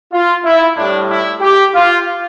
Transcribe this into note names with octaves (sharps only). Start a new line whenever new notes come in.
F4
E4
A2 G3 D4
E4
G4
F4